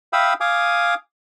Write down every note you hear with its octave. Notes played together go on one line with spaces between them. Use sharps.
E5 F5 G5 B5 D#6 E6
F5 G#5 D6 D#6